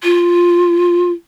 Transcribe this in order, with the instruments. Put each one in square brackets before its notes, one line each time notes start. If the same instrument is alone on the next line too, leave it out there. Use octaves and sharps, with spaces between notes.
[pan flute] F4